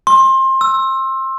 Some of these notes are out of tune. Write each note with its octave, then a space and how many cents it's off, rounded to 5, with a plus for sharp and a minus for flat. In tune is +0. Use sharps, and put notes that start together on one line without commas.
C6 +25
E6 +5